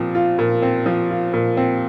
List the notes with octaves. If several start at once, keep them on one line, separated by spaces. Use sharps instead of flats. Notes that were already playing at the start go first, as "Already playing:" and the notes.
Already playing: A#2 F3 C4
F4
A#2
C4
F3
F4
A#2
C4